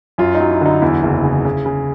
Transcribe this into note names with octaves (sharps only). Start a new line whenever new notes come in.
F#2 F4
D#4
F#3
E4
D3 D#4
E2 E4
F#1
C#3
C#3
C#3